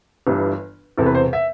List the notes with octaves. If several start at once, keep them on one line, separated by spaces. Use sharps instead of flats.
G1 G2 E3 G3
E1 E2 C3 A4
B4
C5
E5